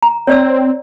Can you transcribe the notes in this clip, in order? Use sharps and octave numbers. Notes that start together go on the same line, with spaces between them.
A#5
C4 C#5 D5 E6